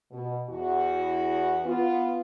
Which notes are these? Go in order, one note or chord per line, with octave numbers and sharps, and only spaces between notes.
B2
E2 E4 F#4
B3 F4